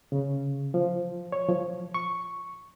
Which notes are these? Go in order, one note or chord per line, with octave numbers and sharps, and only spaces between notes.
C#3
F3
C#5
F3
C#6